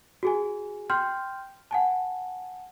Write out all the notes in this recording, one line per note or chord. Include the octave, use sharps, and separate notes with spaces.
F#4 G#4 G#5
G5 C6 F6 G6
F#5 G#5 A5